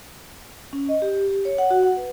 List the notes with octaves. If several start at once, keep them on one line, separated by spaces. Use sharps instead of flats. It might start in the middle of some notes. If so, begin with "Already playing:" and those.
C#4
D#5
G4
G4
C#5
F#5
F#4
F#5
B4